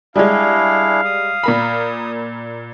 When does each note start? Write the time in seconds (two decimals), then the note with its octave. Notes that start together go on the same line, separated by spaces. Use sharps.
0.16 G3 G#3 D4 E4 G#4 F5
1.05 D#6
1.43 A#2 A#4 B5